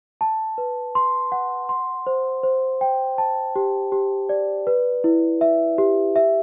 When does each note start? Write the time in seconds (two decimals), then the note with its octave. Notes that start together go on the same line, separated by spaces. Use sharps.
0.21 A5
0.58 B4
0.95 C6
1.32 F#5
1.69 C6
2.07 C5
2.43 C5
2.81 G5
3.18 A5
3.56 G4
3.92 G4
4.29 D5
4.67 B4
5.04 E4
5.41 E5
5.78 G4
6.16 E5